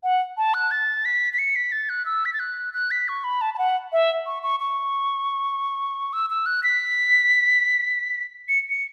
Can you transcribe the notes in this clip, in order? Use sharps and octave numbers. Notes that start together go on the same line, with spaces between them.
F#5
A5
F#6
A6
B6
B6
C#7
B6
A6
F#6
E6
B6
A6
F#6
F#6
B6
C#6
B5
A5
A5
F#5
E5
C#6
C#6
C#6
E6
E6
F#6
B6
C#7
C#7